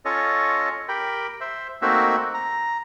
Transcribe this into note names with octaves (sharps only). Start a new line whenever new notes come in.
C#4 F4 A4 C#5 D#5
G4 A#4 G5 B5
C5 E5
A3 A#3 C4 D#4 F#4 E5
A#5